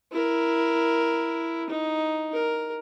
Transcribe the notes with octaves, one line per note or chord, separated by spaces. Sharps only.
E4 A#4
D#4
A#4